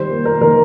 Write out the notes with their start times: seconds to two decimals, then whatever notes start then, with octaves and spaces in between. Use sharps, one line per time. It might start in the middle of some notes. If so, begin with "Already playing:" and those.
Already playing: D#3 G3 C5
0.10 A#3
0.25 A#3 A#4
0.41 D#3 A#4